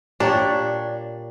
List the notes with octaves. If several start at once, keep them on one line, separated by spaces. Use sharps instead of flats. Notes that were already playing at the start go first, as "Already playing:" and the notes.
A#2 D4 G4 C#5